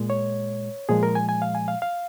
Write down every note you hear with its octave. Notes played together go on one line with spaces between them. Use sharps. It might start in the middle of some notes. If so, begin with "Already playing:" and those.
Already playing: A#2 G#3
C#5
A#2 F3 G#3 G#4
A#4
G#5
G#5
F5
G#5
F5
F5